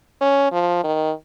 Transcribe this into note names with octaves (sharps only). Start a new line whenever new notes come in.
C#4
F3
D#3